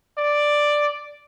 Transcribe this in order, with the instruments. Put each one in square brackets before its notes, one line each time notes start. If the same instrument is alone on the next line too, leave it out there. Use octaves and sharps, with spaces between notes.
[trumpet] D5